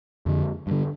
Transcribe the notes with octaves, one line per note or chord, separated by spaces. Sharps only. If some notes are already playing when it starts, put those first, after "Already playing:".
F2 D3
G2 D3